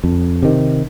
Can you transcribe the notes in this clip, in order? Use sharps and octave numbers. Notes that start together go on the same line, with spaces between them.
F2
C3 D#3